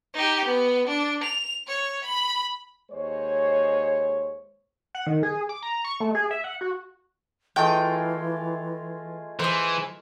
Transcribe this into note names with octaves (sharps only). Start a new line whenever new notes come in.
D#4 G4
B3
D4
F7
C#5
B5
D#2 G#3 C5 C#5
F#5
D#3
G#4
D6
A#5
C#6
A3
G#4
E5
F#5
F#4
E3 G#3 A3 F4 G5
E3 G#4 C5